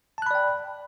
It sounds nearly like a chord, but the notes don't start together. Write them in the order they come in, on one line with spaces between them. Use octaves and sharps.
A5 F#6 B5 D5 G5